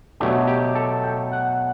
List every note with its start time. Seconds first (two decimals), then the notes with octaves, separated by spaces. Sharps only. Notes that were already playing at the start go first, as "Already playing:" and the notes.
0.20 B2 F#3 A3 D4 G4
0.47 G4
0.75 A4
1.04 G5
1.32 F#5